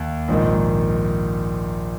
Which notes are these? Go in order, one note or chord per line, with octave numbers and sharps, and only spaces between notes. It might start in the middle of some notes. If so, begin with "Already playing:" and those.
Already playing: D#2
A#1 G#2 D#3